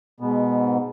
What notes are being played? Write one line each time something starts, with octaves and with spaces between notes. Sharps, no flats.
G#2 B2 B3